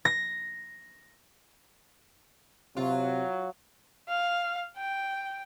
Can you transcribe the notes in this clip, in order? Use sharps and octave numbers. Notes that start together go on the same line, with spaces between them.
A#6
C3 F#3 F4
F5
G5